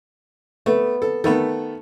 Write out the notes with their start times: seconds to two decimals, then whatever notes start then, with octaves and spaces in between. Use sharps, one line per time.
0.66 A3 B3
1.02 A4
1.24 D#3 A3 B3 A4